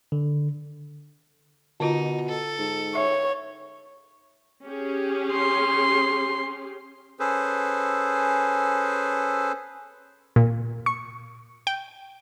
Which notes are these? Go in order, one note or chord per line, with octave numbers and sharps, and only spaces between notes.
D3
B2 D3 D#4 F4
A4
G#2
C#5 E5
C#4 G4 G#4
C6
C#4 G#4 A4 B4 C5
A#2
C#6
G5